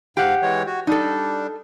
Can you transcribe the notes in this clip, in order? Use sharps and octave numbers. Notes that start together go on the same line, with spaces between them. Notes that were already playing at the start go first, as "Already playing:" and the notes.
G#2 G4 F5 F#5
E3 G#3 C#5
F#4
G3 D4 D#4 A4